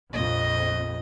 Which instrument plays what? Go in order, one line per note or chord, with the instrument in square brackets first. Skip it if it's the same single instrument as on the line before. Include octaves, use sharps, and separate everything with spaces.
[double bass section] A#1 F2 [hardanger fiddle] D#5